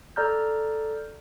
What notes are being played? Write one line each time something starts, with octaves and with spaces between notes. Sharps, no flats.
A4 D5 A#5 F6 G6